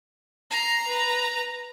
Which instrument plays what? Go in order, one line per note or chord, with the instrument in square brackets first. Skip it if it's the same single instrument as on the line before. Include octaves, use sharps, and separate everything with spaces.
[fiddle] A#5 [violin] C7
[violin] B4